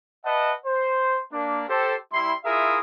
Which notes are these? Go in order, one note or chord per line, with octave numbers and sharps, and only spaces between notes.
B4 D#5 E5 F#5 A5
C5
A#3 D4
G4 A4 C5
G3 E4 C6
E4 F4 G#4 A#4 E5 D#6